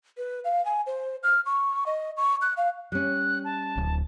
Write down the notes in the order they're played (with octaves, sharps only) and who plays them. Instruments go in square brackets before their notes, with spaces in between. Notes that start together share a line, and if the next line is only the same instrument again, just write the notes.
[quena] B4
F5
G#5
C5
F6
C#6
D#5
C#6
F#6
F5
[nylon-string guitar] G3 C#4 [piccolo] F#6
[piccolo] A5
[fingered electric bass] D1